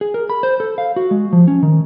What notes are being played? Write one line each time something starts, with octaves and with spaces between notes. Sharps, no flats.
G#4
A#4
B5
C5
A4
F5
F#4
G#3
F3
C#4
D#3